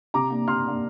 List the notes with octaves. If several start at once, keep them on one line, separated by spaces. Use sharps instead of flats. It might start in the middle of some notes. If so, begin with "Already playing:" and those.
C3 A#5 D6
A#3 D4
C3 C6 F6
A#3 D4